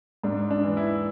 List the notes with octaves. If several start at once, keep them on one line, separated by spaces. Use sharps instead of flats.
G#2 D4
D4
E3
E4